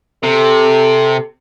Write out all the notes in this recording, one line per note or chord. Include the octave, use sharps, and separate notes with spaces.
C3 A4